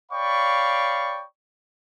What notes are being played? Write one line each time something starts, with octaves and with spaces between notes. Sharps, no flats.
C#5 D5 F5 G5 B5 C#6